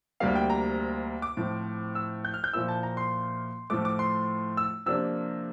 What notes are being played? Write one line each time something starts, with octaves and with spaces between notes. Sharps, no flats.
D2 C3 G3 A#3 F5
G5
A#5
D6
A2 F3 C4
E6
G6
F6
G6
A#2 F3 A#3 E4 E6
A5
A#5
C6
A2 F3 A3 D6
D6
C6
E6
C3 F3 A#3 D4 E6